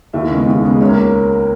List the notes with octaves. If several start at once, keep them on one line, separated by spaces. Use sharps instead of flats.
D#2 E4 E5
C#3 G#3 B3
D#2
C#3 G#3 B3
C#2 C#4 C#5
A#3 A#4